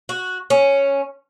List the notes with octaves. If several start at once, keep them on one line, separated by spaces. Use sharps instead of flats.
F#4
C#4